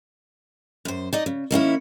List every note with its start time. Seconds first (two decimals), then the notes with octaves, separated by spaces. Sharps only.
0.85 F#2 C5
1.13 D#4 D5 D#5
1.26 C#3
1.51 D#3 A#3 C#4 E4